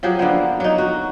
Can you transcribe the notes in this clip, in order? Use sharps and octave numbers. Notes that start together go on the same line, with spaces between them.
F3 F#3 G4 G#4
D3 A#3 B3
F#3 D#4
F#4